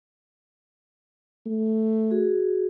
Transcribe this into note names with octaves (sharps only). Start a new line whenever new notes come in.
A3
F#4 G#4